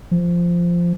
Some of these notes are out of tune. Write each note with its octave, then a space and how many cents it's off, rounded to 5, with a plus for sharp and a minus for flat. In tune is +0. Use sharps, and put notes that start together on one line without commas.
F3 -10